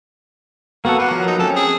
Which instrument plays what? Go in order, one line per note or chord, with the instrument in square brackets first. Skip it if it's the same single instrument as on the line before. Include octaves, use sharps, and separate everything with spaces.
[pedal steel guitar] A#3 B3 A4 [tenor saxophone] F#4
[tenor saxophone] A#3 [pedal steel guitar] B4 F#5
[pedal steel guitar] F3 F#3
[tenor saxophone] D#4
[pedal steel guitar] C4 C#4 [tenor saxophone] A4
[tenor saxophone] G#4